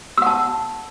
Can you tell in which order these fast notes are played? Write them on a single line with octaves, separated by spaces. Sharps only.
E6 F#5 A5